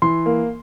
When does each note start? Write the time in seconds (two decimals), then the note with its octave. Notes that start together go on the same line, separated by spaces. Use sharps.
0.02 E3 C6
0.26 A#3